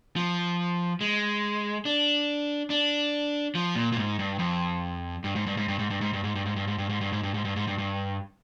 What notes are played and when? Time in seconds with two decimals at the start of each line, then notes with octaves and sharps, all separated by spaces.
0.16 F3
1.01 G#3
1.85 D4
2.70 D4
3.55 F3
3.75 A#2
3.92 A#2
3.97 G#2
4.19 G2
4.39 F2
5.24 G2
5.36 G#2
5.46 G2
5.57 G#2
5.68 G2
5.79 G#2
5.90 G2
6.01 G#2
6.13 G2
6.24 G#2
6.35 G2
6.46 G#2
6.56 G2
6.67 G#2
6.78 G2
6.89 G#2
7.01 G2
7.13 G#2
7.23 G2
7.34 G#2
7.45 G2
7.56 G#2
7.67 G2
7.78 G2